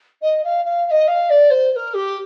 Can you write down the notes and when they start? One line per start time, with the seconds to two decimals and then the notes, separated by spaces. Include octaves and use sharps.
0.22 D#5
0.44 F5
0.65 F5
0.86 F5
0.90 D#5
1.07 F5
1.29 D5
1.50 C5
1.72 C5
1.75 A#4
1.94 G4